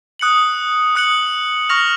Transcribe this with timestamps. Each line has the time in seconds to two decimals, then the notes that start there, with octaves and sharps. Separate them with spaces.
0.19 D#6 F#6 C#7 F#7
0.95 D#6 F#6 C#7 F#7
1.69 C#6 F6 A#6 F7